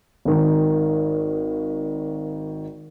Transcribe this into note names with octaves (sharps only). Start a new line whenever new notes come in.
G#1 D#3